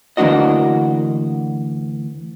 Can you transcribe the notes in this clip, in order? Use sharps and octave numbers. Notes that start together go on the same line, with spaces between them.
D2 E3 A#3 D4 F#4 D#5